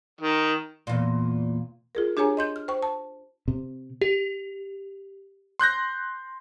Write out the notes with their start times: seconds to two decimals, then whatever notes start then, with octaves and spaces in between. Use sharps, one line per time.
0.21 D#3
0.87 E2 A#2
1.95 F4 G#4 A#4
2.17 D4 G4 G#4 C#5 G#5 A#5
2.37 D#5 C6 G6
2.56 F6
2.68 C5 G5 C#6
2.83 A5
3.48 C3
4.01 G4
5.59 C6 F#6 G6 A#6